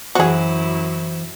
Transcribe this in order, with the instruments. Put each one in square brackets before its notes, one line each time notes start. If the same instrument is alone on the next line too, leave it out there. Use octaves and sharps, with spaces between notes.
[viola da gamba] F#2 E4 [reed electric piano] E3 C5 [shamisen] F#4 G#4